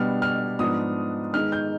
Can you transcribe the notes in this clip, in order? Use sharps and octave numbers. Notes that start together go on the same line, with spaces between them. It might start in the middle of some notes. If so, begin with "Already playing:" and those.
Already playing: B2 G3 B3 D4 F6
F6
G#2 F3 B3 D4 D#6
G#2 D#3 G#3 B3 D#4 F6
G6